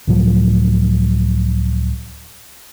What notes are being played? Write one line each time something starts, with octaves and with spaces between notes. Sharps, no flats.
C#2 A2 F3 F#3